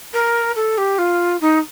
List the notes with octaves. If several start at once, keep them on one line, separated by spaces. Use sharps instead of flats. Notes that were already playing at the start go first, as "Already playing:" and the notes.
A#4
A4
G4
F4
D#4